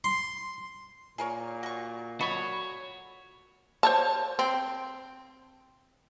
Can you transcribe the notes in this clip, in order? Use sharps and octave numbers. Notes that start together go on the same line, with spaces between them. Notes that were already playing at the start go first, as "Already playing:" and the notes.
C6
A#2 G#4 A#4 C#5
F#4 C#6
F#4 A4 C#5 D#5 B5
C5 C#5 A5
C4